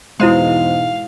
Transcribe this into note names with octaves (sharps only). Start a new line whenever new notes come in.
E2 G#2 B2 G#3 E4 C5 F5 D#6